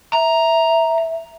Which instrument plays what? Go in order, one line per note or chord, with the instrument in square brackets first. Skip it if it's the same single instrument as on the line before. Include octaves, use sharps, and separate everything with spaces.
[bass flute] E5 [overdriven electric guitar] A#5